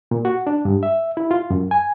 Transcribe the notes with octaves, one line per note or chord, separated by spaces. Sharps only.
A#2
F#4
D4
G2
E5
E4
F4
F#2
G#5